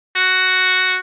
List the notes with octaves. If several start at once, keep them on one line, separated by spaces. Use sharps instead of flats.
F#4